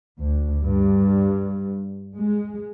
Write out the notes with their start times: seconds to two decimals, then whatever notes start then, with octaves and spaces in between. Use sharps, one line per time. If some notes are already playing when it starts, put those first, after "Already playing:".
0.20 D2
0.63 G2
2.18 G#3